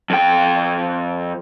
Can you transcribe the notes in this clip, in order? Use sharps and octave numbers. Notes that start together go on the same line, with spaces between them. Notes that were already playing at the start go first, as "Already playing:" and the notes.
F2 G5